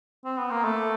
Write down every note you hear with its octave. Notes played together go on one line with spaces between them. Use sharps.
C4
B3
A#3
A3